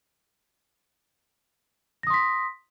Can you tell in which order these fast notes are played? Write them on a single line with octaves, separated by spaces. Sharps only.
A#6 D#6 C6 B6